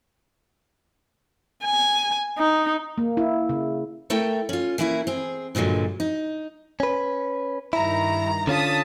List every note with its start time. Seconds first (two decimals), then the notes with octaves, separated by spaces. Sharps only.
1.64 G#5
2.39 D#4
2.98 A#3
3.17 E4
3.49 C#3
4.10 A3 E4 A4 A#4 G5
4.49 C#4 F4
4.78 E3 A#3 C#4 E4 A#4
5.07 C4 G#4
5.55 G2 A#2 D3 F#3 G#3
6.00 D#4
6.80 C#4 B4
7.73 G2 D#3 E4 A#5
8.47 D3 C#4 F4 A5 D#6 B6